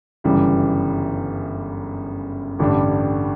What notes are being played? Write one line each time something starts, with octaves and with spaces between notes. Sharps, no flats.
G1 F#2 C#3 E3 G3
A1 G2 D3 G3 D4